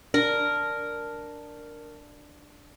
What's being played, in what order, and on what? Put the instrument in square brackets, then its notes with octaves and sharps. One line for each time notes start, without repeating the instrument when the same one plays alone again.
[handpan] D4 [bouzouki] A#4